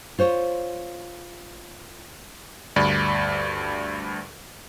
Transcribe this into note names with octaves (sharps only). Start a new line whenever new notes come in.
F4 C5 C#5
D2 G2 D5 B5